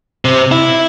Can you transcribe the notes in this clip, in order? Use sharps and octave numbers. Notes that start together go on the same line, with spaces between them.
C3
E4